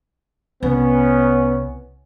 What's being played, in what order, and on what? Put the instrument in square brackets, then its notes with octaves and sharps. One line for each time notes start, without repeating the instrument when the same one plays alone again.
[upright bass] C2 [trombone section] B3 C#4